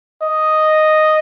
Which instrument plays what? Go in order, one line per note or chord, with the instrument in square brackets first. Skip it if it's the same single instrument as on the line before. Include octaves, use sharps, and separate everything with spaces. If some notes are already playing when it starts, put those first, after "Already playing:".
[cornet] D#5